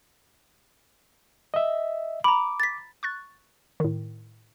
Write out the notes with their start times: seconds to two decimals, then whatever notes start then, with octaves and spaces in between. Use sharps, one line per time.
1.54 D#5 E5
2.24 A#5 B5 D6
2.60 A6 B6
3.03 C#6 F#6 A6
3.80 A2 D#3